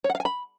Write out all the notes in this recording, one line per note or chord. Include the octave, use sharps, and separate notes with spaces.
C#5
F#5
F5
G#5
B5